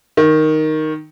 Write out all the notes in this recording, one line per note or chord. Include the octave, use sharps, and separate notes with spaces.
D#3